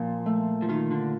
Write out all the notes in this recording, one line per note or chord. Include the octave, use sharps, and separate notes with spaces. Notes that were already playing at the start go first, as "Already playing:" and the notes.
Already playing: A#2 F3
A3
F3
D#3 F4
D3